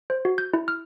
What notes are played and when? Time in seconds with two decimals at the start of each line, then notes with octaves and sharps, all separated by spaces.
0.10 C5
0.25 F#4
0.38 G6
0.54 E4
0.68 F6